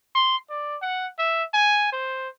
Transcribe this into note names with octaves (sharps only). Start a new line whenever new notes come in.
C6
D5
F#5
E5
G#5
C5